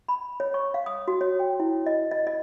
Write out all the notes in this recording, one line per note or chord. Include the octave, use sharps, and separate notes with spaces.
B5
C#5
C#6
F5
D#6
F#4
C#5
G5
E4
D#5
D#5
D#5